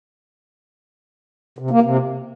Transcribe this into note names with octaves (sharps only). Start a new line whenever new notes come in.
C3
A#3
C3